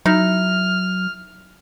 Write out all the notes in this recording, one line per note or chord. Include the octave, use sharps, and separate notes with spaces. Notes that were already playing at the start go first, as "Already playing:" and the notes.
F#3 D#4 E4 F6